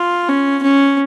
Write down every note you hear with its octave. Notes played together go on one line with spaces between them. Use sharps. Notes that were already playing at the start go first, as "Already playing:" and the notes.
Already playing: F4
C#4
C#4